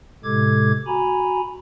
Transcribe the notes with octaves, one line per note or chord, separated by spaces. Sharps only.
A2 C3 G#3 A4 D6 G#6
F#4 G#5 A#5 B5